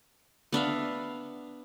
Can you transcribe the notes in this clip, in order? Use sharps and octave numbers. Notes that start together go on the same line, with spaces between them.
B3 D4 E5 F5